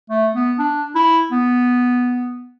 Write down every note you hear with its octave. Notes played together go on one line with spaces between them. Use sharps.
A3
B3
D4
E4
B3